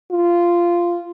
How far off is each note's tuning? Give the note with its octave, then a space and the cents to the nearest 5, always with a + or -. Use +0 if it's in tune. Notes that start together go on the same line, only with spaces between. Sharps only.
F4 -10